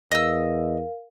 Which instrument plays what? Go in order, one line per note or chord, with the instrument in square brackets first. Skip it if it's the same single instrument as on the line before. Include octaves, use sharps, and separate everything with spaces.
[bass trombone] E2 [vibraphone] A#4 F5 [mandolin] D#5 E6